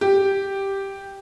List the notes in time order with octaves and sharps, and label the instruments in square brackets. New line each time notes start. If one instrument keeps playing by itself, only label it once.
[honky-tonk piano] G4